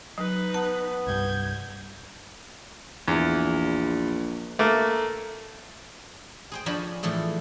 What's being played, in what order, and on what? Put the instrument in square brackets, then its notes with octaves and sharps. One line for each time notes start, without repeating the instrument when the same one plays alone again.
[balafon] F#3 [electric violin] D#4 B4
[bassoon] B3 [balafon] A5
[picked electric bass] C2 G2 [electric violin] G6 G#6
[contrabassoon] A#1 [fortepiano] E2
[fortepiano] A3 A#3
[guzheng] G#4 C5 G5
F3 D4 C#5 D#5 G5 B5
A2 E3 F3 A3 G#4